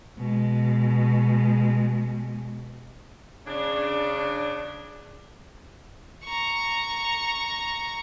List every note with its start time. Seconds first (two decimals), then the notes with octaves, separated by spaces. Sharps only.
0.18 B2 G#3
3.47 C#3 D4
6.24 A#5 C#6